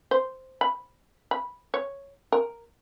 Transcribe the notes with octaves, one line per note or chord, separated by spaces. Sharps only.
C5
B5
B5
C#5
A#4